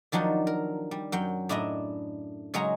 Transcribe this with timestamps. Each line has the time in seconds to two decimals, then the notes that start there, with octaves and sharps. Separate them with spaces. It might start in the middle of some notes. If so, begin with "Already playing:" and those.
0.12 D#3 F3 F#3 D4 D#4
0.47 A#4
0.91 G3
1.12 F#2 F#3 G5
1.49 A2 D4 E4 D#5 A#5
2.54 C#3 F#3 G#3 G#4 C#5 A#5